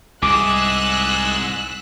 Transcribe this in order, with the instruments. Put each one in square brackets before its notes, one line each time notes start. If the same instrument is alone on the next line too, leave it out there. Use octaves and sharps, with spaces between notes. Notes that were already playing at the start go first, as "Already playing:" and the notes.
[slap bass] C2 [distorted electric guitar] G#2 G#4 [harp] D6 [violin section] E6 F#6